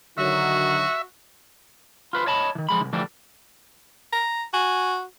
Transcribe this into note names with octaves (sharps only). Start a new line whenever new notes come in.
D3 D#3 F#3 F#4 E5
F4 B4 C5
C#5 D#5 A5 B5
D#3 E3
F3 G#3 B5
C2 D#3
D2 E3 F3 G3 D4
A#5
F#4 G#5